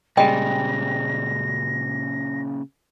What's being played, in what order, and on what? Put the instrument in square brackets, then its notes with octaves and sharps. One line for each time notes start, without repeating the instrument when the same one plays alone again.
[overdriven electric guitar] A#2 C#3 [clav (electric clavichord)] G3 G#3 [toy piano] D#5 G5 [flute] A#6